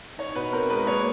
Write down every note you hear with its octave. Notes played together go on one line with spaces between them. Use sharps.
D#4 C#5
B2 B4
C4 A#4
G#3 B4
A#3 C#5